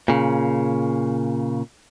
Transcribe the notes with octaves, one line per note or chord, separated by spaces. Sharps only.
A#2 C#3